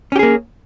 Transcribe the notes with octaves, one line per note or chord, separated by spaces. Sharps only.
A#3 C#4 G4 G#4